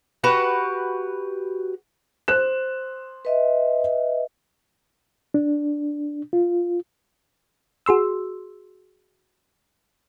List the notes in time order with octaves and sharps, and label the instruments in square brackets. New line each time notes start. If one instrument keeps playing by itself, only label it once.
[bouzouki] F#4 G4 B4 F#5
[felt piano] C5 F#6 E7
[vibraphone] B4 D#5 E5
[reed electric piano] D4
F4
[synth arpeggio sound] F#4 G#4 C6 E6